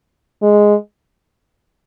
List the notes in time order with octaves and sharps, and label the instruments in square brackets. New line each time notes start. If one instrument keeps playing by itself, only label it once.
[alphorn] G#3